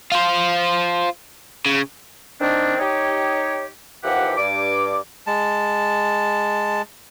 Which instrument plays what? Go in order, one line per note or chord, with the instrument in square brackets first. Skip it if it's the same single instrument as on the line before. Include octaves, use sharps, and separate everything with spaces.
[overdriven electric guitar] F4 C5
C#3
[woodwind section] D#3 C4 D4
D#4 G4 C#5
D#2 E3 F3 G4 F#5
G2 D6
[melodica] G#3 A5